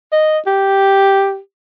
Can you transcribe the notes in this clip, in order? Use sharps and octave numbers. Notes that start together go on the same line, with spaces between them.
D#5
G4